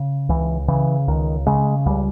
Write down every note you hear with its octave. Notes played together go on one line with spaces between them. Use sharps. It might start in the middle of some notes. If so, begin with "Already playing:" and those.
Already playing: C#3
C#2 E3
C#3 E3
C#2 D#3
C#3 G#3
C#2 G3